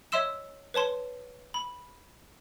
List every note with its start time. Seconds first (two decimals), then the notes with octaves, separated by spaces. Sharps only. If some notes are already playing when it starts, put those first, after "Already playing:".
0.12 C#5 D#5 E5 C6 E6 E7
0.74 B4 C#5 A5 C6
1.54 B5